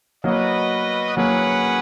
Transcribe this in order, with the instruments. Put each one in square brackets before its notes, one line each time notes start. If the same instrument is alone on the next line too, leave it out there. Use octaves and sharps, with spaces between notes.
[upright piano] F#3 A#3 [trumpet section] B3 F#4 B4 D#5
[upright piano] F#3 A#3 [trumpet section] C#4 G#4 B4 F#5